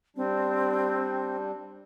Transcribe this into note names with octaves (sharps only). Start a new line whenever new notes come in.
G3 C4 D4